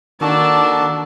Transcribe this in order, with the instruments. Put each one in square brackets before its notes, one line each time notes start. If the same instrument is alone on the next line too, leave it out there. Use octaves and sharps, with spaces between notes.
[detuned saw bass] D#3 [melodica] A#3 F#4 A4 [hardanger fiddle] D4 [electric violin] A5